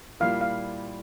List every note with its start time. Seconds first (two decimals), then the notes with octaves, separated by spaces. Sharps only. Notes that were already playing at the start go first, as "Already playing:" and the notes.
0.20 A#2 G3 A#3 E4 F5
0.41 F5